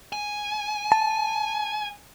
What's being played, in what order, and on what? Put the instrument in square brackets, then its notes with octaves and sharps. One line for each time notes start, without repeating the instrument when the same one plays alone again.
[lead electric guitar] G#5
[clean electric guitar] A5